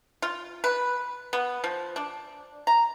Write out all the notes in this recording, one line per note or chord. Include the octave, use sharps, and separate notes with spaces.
F4
B4
B3
F3
D4
A#5